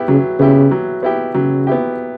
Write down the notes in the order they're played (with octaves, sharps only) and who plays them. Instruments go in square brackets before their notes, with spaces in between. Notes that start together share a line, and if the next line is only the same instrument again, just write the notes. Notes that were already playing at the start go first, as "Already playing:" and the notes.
Already playing: [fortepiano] B3 E4 G4
[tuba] C#3 [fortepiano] F#3
[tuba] C#3 [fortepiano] B3 E4 G4
[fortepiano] F#3
B3 E4 G4
[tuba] C#3 [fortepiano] F#3
[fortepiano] B3 E4 G4